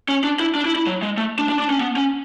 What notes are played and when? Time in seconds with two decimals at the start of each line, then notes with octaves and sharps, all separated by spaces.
0.09 C#4
0.24 D4
0.40 E4
0.55 D4
0.66 E4
0.76 E4
0.87 F#3
1.02 G#3
1.17 A3
1.39 D4
1.49 D4
1.60 D4
1.70 C#4
1.81 B3
1.96 C#4